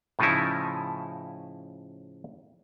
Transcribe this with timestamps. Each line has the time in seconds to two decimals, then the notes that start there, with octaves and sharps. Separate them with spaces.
0.19 A2 C#3 F3 D#4 E4